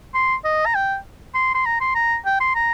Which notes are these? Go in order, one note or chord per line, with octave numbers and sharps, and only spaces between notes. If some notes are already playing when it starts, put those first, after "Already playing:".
C6
D#5
A#5
G5
C6
C6
A#5
C6
A#5
G5
C6
A#5